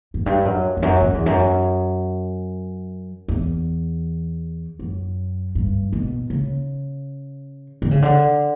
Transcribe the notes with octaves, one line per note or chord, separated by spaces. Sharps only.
F#2
G2
F#2
E2
F#2
F#2
E2
F#2
E2
F#2
G2
B2
C#3
D3
C#3
D3